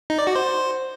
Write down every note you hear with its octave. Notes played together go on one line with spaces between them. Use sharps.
D#4
D5
F#4
C5